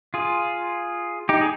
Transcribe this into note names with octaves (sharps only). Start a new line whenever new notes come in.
F4 G#4
D#4 G4
G#4